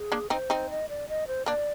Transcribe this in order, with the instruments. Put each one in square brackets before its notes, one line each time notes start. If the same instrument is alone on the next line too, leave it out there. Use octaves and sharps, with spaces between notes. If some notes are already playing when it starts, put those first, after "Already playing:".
Already playing: [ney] G#4
[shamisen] A#3 D4
[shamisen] C4 D#4 [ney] C5
[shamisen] C4 D#4
[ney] D#5
D5
D#5
C5
[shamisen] A#3 D4 [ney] D5